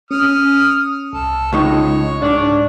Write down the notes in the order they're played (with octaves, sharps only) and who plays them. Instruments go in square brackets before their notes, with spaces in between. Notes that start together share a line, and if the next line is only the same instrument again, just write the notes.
[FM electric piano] C#4 [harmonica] D#6 F6
[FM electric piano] C2 [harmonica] A4
[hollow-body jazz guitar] C#2 G#3 D#4 [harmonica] C#5
[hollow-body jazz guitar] G#2 [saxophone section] D4